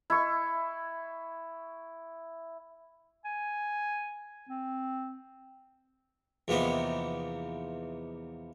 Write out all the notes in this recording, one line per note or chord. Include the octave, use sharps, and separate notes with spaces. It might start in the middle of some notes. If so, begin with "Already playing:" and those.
E4 C#6
G#5
C4
E2 C3 F3 A#3 B3 D#4